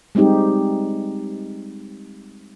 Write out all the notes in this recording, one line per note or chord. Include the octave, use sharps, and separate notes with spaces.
G3 G#3 C4 D#4 G4